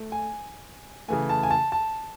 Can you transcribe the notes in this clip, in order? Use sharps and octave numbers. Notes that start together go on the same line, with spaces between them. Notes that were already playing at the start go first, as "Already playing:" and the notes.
Already playing: A3
G#5
C#3 E3 A3 G#5
A5
G#5
A5
A5